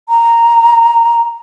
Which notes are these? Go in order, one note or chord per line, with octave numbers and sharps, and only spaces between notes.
A#5